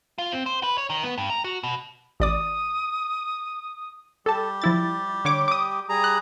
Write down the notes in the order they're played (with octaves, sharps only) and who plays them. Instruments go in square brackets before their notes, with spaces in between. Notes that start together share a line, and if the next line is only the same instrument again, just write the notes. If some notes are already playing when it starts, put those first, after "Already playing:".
[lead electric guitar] F4
C4
C5
B4
C#5
D#3
B3
G2
A#5
F#4
B2
[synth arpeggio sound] A1 D5 D6 [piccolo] D#6
[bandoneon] G3 G4 [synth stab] A4 A5
[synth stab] F3 E4 A6
D3 C#5 D6
D6 D#6
[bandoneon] G3 G#4 A#5
[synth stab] F#6